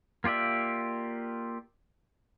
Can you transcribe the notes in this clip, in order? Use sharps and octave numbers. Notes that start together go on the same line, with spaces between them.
A#3 F4 G4 D5 E5